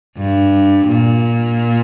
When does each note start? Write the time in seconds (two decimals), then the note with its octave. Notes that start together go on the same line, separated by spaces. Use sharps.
0.17 G2
0.86 A#2